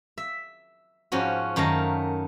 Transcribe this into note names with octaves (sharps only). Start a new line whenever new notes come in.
E5
G#2 F3 C#4 F#4
F#2 D#3 A3 F5 A#5